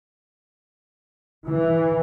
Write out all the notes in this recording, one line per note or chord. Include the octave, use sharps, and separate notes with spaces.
E3